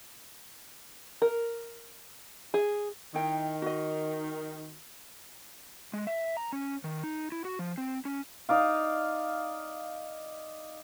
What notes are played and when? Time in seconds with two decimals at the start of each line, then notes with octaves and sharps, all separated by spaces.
1.22 A#4
2.54 G#4
3.14 D#3 E4 G5
3.62 F#4 D#5
5.93 G#3
6.07 E5
6.37 A#5
6.53 C#4
6.84 D#3
7.03 D#4
7.32 E4
7.45 F#4
7.59 F3
7.78 C4
8.05 C#4
8.49 D#4 D5 F5